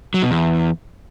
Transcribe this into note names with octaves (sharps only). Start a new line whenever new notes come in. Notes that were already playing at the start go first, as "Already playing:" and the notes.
F#3
B2
E2